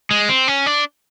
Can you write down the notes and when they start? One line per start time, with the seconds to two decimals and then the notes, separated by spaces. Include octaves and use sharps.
0.11 G#3
0.29 C4
0.48 C#4
0.66 D4